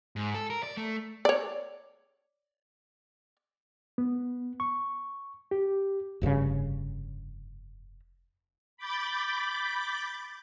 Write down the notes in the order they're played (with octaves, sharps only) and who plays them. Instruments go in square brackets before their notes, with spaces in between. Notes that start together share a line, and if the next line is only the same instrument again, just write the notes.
[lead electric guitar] G#2
A4
A#4
D5
A3
[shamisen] C#5 D5
[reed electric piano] B3
C#6
G4
[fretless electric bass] F1 G2 A#2 C#3
[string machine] B5 D6 G6 A6